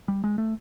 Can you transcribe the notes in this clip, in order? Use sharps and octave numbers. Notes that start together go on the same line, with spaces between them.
G3
G#3
A3